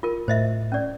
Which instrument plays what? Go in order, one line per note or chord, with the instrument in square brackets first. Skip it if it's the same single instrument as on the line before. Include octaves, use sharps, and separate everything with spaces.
[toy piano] F4 A#4
[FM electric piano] A2 [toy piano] C5 D#5 E5
[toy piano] C#4 D5